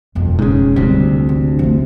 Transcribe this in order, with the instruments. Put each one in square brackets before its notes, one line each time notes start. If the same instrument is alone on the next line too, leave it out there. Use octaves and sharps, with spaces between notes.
[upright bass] E1 F2
[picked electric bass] G#2 C#3
[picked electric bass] D2 C3 [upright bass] G3
[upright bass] D4
F3 A3